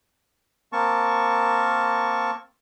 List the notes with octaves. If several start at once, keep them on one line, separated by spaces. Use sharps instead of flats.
A#3 C4 A#4 A5 C#6